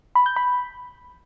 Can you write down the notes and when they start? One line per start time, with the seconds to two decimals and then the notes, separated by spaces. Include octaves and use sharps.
0.15 B5
0.26 G6
0.36 B5